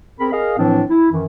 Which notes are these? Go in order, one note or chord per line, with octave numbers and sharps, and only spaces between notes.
C4 G#4 A#4 B5
G#4 A#4 D#5 F5
A2 E3 F3 C4 D4
E4
F#2 D#3 E3